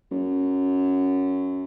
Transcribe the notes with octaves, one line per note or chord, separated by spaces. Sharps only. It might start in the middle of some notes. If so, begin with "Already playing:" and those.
F#2